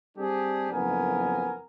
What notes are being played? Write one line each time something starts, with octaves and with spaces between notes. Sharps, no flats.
G3 C4 D4 G4 G#4
F#1 F2 B3 A#4 G#5